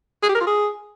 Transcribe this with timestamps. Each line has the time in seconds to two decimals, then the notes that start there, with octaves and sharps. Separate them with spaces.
0.23 G#4
0.29 G4
0.35 A#4
0.41 F4
0.47 G#4